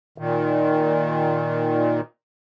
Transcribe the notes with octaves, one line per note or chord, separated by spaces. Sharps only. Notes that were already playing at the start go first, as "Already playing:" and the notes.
A#2 D#3